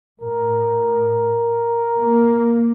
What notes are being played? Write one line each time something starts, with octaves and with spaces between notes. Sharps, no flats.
A2 A#4
A#3